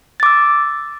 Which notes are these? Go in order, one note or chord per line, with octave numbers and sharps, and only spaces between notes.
D6 E6 A6